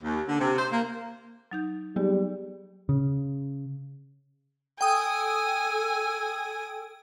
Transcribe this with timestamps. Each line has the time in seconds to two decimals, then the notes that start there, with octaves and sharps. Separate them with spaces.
0.02 D#2
0.27 D3
0.38 C3
0.57 C5
0.71 A#3
1.51 F#3 D#4 G6
1.96 F#3 G3 B3 G4 G#4
2.89 C#3
4.81 A4 G5 G#5 D#6